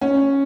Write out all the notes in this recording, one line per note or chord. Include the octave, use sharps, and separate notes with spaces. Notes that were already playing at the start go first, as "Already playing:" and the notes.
C#4